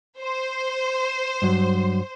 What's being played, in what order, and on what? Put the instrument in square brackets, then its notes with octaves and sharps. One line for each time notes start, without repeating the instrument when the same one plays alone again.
[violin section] C5
[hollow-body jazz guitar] G2 F#3